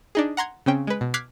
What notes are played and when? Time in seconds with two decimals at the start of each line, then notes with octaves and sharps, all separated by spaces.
0.15 D4 D#4 G#4
0.37 F#5 A#5 C6 G#6
0.66 C#3 C4 C#4 G5
0.87 G#3 B4
1.01 B2
1.14 D6 F6 F#6 G#6 B6 C7